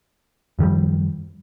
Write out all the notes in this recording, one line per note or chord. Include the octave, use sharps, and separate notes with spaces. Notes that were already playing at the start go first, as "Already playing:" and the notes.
F#2 D#3 F3 G3